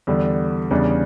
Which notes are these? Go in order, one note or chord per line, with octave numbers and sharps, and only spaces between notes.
E2 D3 G3
E2 C#3 G3 D4